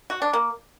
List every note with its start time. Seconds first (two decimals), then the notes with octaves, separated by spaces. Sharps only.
0.10 F#4
0.22 D4
0.33 A#3